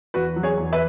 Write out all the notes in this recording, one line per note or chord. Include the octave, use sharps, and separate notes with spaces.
E2 F#4 B4
F#3
G#4 C#5
E2
B4 E5